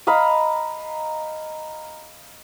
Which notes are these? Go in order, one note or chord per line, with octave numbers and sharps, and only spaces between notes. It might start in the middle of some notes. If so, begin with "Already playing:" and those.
D#5 F5 A#5 B5